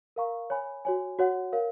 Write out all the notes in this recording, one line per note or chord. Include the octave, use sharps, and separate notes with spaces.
A#4 F5 A#5 C#6
C#5 G#5 B5
F#4 C#5 G#5
F#4 C#5 F#5
A#4 C#5 F5